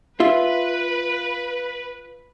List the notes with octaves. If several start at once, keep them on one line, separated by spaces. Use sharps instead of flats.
F4 B4 E5